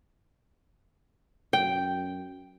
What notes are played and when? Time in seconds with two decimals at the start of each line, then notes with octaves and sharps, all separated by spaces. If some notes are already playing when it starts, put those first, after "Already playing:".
1.53 F#2 G5